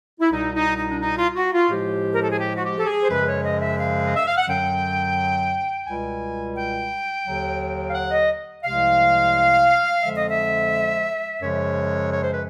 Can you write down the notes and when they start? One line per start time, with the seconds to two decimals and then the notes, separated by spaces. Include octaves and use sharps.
0.20 E4
0.32 C2 B2 G3 D#4
0.54 D#4
0.77 D#4
0.89 D4
1.01 D#4
1.18 F4
1.31 F4
1.36 F#4
1.53 F4
1.70 A2 F3 G#3 G4
2.13 A#4
2.22 A4
2.30 G#4
2.40 G4
2.56 F#4
2.63 G4
2.78 A4
2.85 G#4
3.03 C5
3.09 F#2 C#3 F3 G#3 B4
3.27 C#5
3.44 D#5
3.60 E5
3.78 F5
4.06 D#5
4.16 E5
4.27 F5
4.37 F#5
4.48 F#2 D3 F#3 G5
5.86 C#2 B2 G3 G#5
6.56 G5
7.25 D#2 D3 F#3
7.89 F5
7.95 F#5
8.11 D#5
8.64 C2 C3 F3 G#3 F5
10.02 F2 D3 F3 G#3 E5
10.15 D#5
10.30 E5
11.41 F#2 C#3 F3 G#3 C#5
12.11 C#5
12.22 C5
12.32 B4